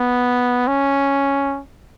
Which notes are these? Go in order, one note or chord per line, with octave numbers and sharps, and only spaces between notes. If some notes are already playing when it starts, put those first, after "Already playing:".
Already playing: B3
C#4